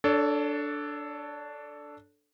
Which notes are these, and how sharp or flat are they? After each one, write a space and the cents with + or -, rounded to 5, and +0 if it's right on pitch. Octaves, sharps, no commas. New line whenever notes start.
D4 +0 A4 +0 C#5 +30